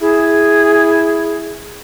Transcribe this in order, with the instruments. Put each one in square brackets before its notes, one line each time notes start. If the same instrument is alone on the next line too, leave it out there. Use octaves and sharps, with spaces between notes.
[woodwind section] E4 [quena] G#4